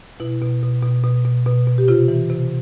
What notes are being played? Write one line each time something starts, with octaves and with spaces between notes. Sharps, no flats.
B2 E4
B2
B2
B2
B2
B2
B2
B2
G4
C3 F4
E3
C3